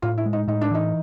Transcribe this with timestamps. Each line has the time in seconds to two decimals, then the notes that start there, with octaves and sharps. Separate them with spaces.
0.02 A2 F4
0.18 E4
0.25 G#3
0.33 D#4
0.48 A2 D#4
0.61 D4
0.71 E3 D#4